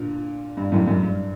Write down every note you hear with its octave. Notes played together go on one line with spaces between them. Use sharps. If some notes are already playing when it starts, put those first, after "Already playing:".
Already playing: A#2 D3
G2
F#2 A2
F#2
G2